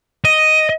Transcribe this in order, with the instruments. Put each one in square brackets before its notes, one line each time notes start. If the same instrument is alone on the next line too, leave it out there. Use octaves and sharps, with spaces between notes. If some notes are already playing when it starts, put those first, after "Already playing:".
[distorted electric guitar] D#5